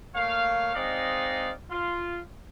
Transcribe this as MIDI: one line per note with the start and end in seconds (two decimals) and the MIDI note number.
0.15 0.73 57
0.15 0.73 58
0.15 0.73 73
0.15 0.73 77
0.75 1.51 56
0.75 1.51 60
0.75 1.51 63
0.75 1.51 74
0.75 1.51 75
0.75 1.51 77
1.71 2.18 65